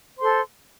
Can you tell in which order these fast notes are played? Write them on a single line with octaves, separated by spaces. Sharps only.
C5 C6 A4